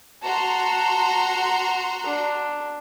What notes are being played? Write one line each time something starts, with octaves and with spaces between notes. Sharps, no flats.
F#4 A5 A#5 C6
D4